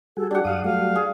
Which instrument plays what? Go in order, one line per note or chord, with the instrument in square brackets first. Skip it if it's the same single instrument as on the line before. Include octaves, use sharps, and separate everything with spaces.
[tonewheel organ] G3 F#4 G#4 [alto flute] A4
[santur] D4 F#5 [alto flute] G4
[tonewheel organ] F#2 D#6 [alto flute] F5
[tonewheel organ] F#3 G3 A3 [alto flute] F5
[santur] G#4